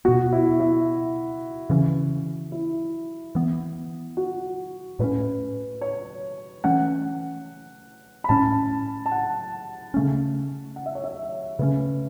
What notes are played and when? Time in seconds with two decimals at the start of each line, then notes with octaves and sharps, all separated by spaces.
0.05 B2 B3 F#4
0.33 E4
0.60 E4
1.70 C#3 E3 C#4
2.52 E4
3.35 E3 B3
4.17 F#4
4.99 A2 A3 C#4 B4
5.81 C#5
6.64 E3 A3 C#4 F#5
8.24 B5
8.29 A2 A3 C#4 A5
9.06 A5
9.12 F#5
9.94 C#3 A3 C#4
10.76 F#5
10.86 E5
10.95 C#5
11.04 E5
11.59 C#3 A3 C#4 B4